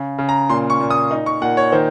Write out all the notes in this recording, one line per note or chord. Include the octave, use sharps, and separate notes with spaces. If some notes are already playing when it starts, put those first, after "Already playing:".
Already playing: C#3
C#3
A#5
A#2 C6
C#6
A#2
D#6
D#4
C#6
A#2 F#5
C#5
D#3 C5